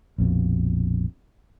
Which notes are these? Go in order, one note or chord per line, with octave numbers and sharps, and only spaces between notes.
A#1 F2 B2